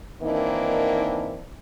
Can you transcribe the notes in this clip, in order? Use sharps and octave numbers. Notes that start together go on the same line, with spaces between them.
D#3 E3 A#3 C4 D4 D#4